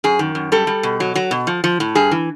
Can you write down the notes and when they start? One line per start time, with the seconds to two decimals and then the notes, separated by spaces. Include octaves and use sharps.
0.04 F#2 G#4
0.19 D#3
0.35 F#2
0.52 G3 A4
0.67 G3
0.83 B2
1.00 F#3
1.15 F#3
1.31 B2
1.47 F3
1.64 F3
1.80 A2
1.95 G2 G#4
2.11 E3